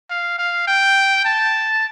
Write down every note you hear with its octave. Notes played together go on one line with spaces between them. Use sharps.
F5
F5
G5
A5